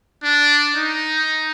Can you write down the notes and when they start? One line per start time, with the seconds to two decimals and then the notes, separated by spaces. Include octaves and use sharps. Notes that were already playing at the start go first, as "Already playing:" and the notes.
0.23 D4
0.76 D#4